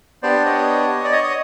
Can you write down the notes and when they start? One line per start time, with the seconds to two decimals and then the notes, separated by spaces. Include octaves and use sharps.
0.23 B3 D4 G4 C5 D5
0.45 C#5 D#5
1.05 D5
1.12 C#5 D#5
1.24 D#5